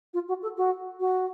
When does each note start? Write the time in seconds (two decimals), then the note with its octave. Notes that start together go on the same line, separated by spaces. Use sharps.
0.13 F4
0.28 F#4
0.42 A4
0.57 F#4
0.99 F#4